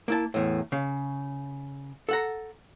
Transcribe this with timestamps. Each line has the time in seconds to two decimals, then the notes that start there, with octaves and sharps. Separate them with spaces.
0.08 A#3 E4 A5
0.34 E2 A2
0.72 C#3
2.09 A4 F#5 A#5